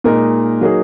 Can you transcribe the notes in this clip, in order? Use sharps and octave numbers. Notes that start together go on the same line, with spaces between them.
A#2 G#3 D#4 A#4
F#3 A#3 D#4 G#4